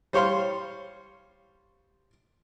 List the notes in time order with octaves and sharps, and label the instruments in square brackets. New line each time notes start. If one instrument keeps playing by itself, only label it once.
[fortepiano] G3 C5 C#5 F5 C6